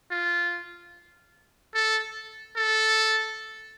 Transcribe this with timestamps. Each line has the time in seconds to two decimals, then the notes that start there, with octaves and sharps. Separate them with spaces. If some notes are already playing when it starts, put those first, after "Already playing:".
0.11 F4
1.75 A4
2.56 A4